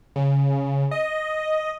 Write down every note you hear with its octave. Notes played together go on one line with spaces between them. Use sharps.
C#3
D#5